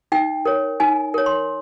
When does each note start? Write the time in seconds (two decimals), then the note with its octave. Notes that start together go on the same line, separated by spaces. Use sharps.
0.12 D#4 G5
0.45 A#4 C#5
0.80 D#4 G#5
1.14 A#4 C#5
1.26 C6